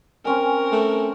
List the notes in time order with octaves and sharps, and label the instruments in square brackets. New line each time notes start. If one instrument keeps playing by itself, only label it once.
[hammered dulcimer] C4 C#4 G#5 [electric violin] A#4
[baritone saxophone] A3